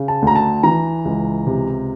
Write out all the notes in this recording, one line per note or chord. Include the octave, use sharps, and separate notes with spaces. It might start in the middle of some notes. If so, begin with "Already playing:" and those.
Already playing: C#3
A5
D2 A#5
A5
E3 A#5
C#2
C3